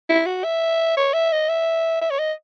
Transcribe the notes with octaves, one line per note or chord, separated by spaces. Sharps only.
E4
F#4
E5
C#5
E5
D#5
E5
E5
C#5
D#5